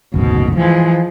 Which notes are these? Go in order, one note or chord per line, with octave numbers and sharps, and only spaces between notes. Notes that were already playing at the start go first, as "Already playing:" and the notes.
F#1 D2 G#2 B2
E3 F3 G#3